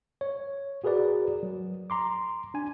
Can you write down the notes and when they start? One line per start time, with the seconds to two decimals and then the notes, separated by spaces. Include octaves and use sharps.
0.21 C#5
0.84 F#4 G#4 A#4 B4 D5
1.43 F#3
1.90 A#5 C6 D6
2.54 D4 G#5